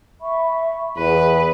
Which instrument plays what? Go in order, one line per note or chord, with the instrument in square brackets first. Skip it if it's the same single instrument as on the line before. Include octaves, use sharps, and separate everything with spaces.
[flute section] E5 B5 C#6
[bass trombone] E2 [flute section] G#4 [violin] B4